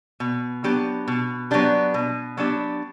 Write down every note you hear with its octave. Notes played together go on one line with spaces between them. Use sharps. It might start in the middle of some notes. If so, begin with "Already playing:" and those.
B2
F#3 B3 D4 G4
B2
F#3 B3 D4 G4
B2
F#3 B3 D4 G4